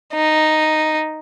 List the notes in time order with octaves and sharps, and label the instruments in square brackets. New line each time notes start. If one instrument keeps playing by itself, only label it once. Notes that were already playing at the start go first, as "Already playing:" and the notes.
[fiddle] D#4